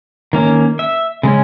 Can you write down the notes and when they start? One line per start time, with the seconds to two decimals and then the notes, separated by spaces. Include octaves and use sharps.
0.33 D#3 A#3 C#4
0.79 E5
1.23 C#3 G#3 C#4